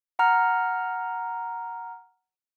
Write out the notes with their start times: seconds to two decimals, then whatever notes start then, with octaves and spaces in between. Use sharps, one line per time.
0.19 F#5 A#5 F6